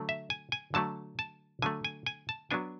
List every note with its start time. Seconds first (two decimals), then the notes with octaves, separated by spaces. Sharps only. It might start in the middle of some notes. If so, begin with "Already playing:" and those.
Already playing: D3 F#3 A3
0.09 E5
0.30 G#5
0.52 G#5
0.74 D3 F#3 A3 A5
1.19 A5
1.62 D3 F#3 A3 G#5
1.85 G#5
2.06 G#5
2.29 A5
2.51 F#3 B3 D4 G#5